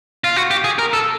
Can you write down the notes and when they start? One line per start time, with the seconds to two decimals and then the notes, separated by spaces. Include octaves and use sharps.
0.24 F4
0.36 F#4
0.51 G4
0.64 G#4
0.79 A#4
0.93 A4